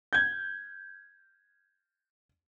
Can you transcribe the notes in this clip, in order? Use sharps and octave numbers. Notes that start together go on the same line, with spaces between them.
G6 G#6